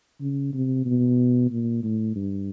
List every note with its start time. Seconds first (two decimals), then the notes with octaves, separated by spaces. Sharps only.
0.20 C#3
0.53 C3
0.85 B2
1.51 A#2
1.83 A2
2.16 G2